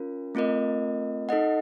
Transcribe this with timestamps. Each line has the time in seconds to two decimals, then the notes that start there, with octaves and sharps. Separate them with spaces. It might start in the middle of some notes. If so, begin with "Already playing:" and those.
Already playing: C#4 F4 A#4
0.35 A3 C4 F4 A#4 D#5
1.29 D#4 A4 D#5 F#5